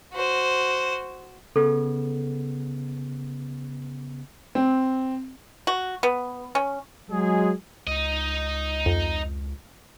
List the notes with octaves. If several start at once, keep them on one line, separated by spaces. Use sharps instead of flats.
F#4 C5
C#3 B3 A4
C4
F#4
B3
C#4
F#3 G#3 G#4
C#2 D#4 D#5
F2